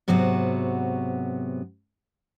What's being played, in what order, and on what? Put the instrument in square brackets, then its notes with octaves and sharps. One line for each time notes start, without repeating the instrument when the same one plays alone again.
[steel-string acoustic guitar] G#2 C3 F#3 B3 F#4